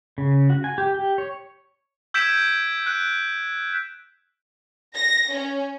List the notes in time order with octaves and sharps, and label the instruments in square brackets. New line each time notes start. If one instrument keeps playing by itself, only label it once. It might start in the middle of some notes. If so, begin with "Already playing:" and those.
[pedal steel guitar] C#3
F#4
G#5
G4
G4
C#5
[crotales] E6 G6 G#6 B6 D7 E7
F#6 D7
[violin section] A#6
C#4